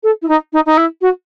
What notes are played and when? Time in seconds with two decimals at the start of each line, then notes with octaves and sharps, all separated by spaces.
0.03 A4
0.22 E4
0.28 D#4
0.53 D#4
0.66 D#4
0.77 E4
1.01 F#4